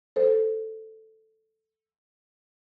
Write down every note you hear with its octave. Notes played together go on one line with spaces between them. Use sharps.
A4 C5